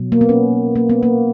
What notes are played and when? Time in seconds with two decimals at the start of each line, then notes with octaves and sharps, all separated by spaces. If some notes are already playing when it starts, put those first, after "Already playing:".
Already playing: B2 F#3
0.12 A#3
0.21 B3
0.29 C#4
0.76 A#3
0.89 B3
1.03 A#3